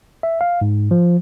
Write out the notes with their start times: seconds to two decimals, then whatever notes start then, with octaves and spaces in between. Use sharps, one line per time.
0.23 E5
0.41 F5
0.61 G#2
0.91 F3